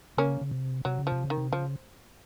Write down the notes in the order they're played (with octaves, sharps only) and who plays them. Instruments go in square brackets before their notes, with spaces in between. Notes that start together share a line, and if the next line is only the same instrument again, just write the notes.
[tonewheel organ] C#3 [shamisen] A#3 C#4
[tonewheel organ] C#3
C3
[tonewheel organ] C3 [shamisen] F#3
[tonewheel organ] C#3
[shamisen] F3
[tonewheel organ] C3
C#3
[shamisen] D#3
[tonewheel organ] C3
[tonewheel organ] C#3 [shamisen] F3